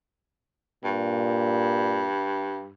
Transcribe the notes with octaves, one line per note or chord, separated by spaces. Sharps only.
G2 A#2